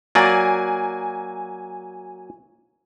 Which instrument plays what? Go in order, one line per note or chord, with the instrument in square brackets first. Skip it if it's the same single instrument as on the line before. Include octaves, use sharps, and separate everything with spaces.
[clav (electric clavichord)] F#3 A#3 D5 [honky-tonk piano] G#5